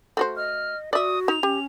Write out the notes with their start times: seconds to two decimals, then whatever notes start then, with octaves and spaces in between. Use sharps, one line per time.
0.17 A3 F#4 C5
0.36 D#5 F6
0.93 F#4 D5 E5 D#6
1.28 D#4 F7
1.43 C#4 G4